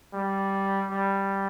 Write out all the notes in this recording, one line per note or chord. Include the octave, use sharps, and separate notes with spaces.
G3
G3